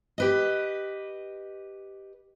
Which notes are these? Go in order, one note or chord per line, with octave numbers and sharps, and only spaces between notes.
G4 B4 D#5